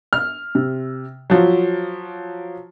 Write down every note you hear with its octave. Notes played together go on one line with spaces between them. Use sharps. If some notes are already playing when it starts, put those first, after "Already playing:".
F6
C3
F3 F#3